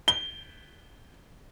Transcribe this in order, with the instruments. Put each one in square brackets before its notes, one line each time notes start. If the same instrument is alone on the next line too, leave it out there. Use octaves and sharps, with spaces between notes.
[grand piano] G7